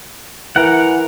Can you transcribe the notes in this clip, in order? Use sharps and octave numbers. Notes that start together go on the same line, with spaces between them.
E3 A#4 F#5